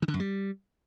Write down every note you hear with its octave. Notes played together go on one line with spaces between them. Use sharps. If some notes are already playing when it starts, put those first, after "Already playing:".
D#3
D3
F#2
G3